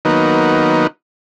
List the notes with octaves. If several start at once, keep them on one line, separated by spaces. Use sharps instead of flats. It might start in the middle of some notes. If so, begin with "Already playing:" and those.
D#3 F#3 A#3 B3 D#4